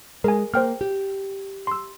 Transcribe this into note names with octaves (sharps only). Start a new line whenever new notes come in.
G#3 A#4 G#5
A#3 C5 G5 F6
G4
C6 E6